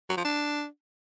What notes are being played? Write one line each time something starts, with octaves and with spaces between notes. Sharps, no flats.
F#3
F3
D4